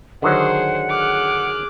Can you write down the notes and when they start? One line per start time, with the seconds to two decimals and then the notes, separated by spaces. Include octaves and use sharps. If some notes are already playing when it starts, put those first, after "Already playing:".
0.22 D3 D#3 F#3 G#4 C5 F#5
0.90 G#4 D6 F6 F#6